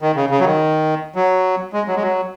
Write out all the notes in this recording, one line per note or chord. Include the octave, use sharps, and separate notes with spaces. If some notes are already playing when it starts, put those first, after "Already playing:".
D#3
C#3
C#3
F#3
D#3
F#3
G#3
F#3
G#3
F#3